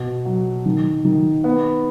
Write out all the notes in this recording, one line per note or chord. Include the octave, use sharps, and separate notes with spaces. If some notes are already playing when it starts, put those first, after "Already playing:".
Already playing: B2
F#3
D#3
D#3
B3